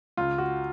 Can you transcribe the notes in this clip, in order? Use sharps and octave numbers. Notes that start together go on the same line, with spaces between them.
C#2 F4
F#4